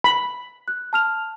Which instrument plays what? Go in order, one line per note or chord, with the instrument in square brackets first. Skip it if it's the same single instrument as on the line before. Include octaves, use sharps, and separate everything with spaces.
[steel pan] B5
[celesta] F#6
A5 F6 F7